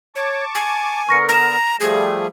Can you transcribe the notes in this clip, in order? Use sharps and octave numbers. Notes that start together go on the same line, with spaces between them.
C#5 A5 C#6 D6
G#5
D3 B3 A#4 C#6 A#6 C#7
A#5 A#6 E7
F3 G3 A3 G#4